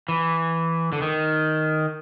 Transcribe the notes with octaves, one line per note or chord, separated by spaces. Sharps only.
E3
D3
D#3